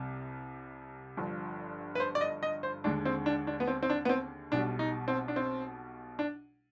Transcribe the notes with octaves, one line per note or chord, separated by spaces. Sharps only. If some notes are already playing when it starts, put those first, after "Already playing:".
Already playing: C2 C3 G3
G1 G2 F3
B4
C5
D5
D#5
D#5
C5
D#2 D3 G#3 D4
C4
D4
D4
B3
C4
C4
D4
B3
C4
B1 B2 G3 D4
D#4
C4
D4
C4
D4